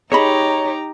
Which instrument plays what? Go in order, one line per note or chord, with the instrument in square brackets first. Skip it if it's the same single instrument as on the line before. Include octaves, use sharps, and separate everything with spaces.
[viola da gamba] D#4 G4 [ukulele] G#4 D#5 B5 [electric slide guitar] C#5 [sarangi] A#5